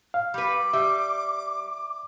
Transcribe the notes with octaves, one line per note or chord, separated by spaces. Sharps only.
F5
G3 B4 D6
G3 E5